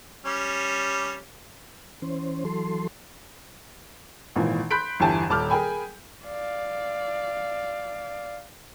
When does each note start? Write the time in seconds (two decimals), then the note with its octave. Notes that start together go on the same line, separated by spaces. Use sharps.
0.25 G3 C#4
2.02 E3 C#4 C5
2.45 E3 F#3 A4 C6
4.36 G#1 A#2 E3
4.71 B5 C6 F#6 G6 B6 D7
5.00 G1 E2 E4 G4 G#5 A5
5.30 D#1 A5 D6 F6 G6
5.50 G#4 A#4 G5 G#5 B5
6.25 D5 F5